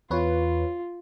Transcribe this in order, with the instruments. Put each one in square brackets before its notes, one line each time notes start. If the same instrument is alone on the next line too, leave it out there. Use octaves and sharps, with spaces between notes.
[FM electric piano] E2 B4 C#5 [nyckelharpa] F4